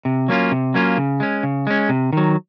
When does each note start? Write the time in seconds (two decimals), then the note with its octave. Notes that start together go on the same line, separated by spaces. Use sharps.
0.05 C3
0.28 F#3 A#3 C#4 F4
0.51 C3
0.74 F#3 A#3 C#4 F4
0.98 C#3
1.20 G#3 C#4
1.43 C#3
1.67 G#3 C#4
1.89 C3
2.13 D#3 F#3